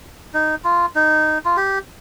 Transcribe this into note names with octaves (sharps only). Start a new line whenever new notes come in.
D#4
F4
D#4
F4
G4